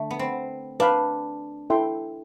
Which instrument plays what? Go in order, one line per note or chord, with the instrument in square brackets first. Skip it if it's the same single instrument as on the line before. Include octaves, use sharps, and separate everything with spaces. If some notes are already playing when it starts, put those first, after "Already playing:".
Already playing: [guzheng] D3 A3
B3
C4
[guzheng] D4 [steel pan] B4 F5 B5
[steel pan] E4 A4 E5 G5 C6